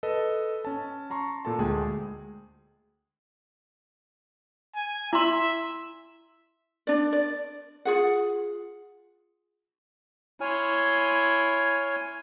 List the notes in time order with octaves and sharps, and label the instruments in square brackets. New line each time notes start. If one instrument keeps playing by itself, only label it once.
[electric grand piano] A4 B4 D#5
C#4 A5
A5 A#5 C6 C#6
A#2 A4 A5
D2 G#3 G#4 G5
[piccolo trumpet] G#5
[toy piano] E4 C6 [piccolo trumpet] E5
[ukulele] D4 D5
D5
F4 G#4 F#5
[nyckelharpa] E4 C6 [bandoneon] C#5 G#5 F6